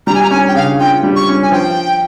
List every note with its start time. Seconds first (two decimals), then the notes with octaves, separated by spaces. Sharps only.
0.07 G3 A#5
0.15 G#5
0.22 A#5
0.31 C#4 G#5
0.48 G5
0.55 C#3 F5
0.80 F4 G5
1.03 G3
1.16 C#6
1.29 C#4
1.43 G#5
1.52 F3 G5